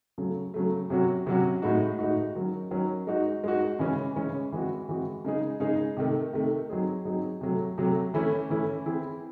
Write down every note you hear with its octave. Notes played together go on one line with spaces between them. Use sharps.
C#3 F#3 A3
C#3 F#3 A3
C3 F#3 C#4 F#4
C3 F#3 C#4 F#4
A2 G#3 D#4 F#4
A2 G#3 D#4 F#4
D#3 F#3 C#4
D#3 F#3 C#4
G#3 D#4 F#4
G#3 D#4 F#4
C#3 E3 G#3 C#4
C#3 E3 G#3 C#4
E3 G#3 C4 F#4
E3 G#3 C4 F#4
C#3 G#3 D#4 G#4
C#3 G#3 D#4 G#4
C3 D#3 A3
C3 D#3 A3
F#3 C4 D#4 G#4
F#3 C4 D#4 G#4
C3 F#3 A3
C3 F#3 A3
E3 A3 C#4 E4
E3 A3 C#4 E4
E3 C4 E4 G#4